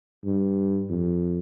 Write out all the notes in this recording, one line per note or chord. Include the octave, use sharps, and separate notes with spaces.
G2
F2